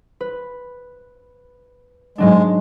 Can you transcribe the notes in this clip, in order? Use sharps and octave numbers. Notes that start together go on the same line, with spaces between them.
B4
G#2 F#3 G#3 D4